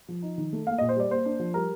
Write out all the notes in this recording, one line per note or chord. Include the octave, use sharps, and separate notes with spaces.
F3
D#4
D#3
A3
A#3 F5
A#2 D#5
C5
G3 D5
A#3 C5
D4
F3
G3 A#4